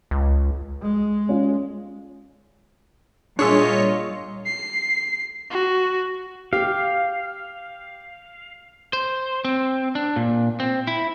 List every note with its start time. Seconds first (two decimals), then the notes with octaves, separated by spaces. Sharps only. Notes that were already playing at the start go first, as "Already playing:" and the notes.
0.11 C#2
0.82 G#3
1.29 C#4 F4
3.39 A#2 G3 D4 F4 G#4 C#5 D#5 E5
4.46 C7
5.50 F#4
6.53 G4 F5
8.93 C5
9.45 C4
9.95 D4
10.16 A#2
10.60 C4
10.87 E4